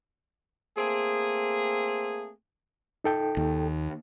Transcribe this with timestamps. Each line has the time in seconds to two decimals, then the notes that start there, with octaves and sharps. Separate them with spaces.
0.76 A3 A#3 C4 G#4
3.04 D#4 A4 G5
3.37 D#2